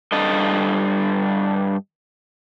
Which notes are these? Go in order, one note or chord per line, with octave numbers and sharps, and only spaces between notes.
G2 A4 D#5